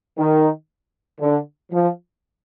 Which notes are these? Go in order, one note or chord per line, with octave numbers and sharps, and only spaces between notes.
D#3
D3
F3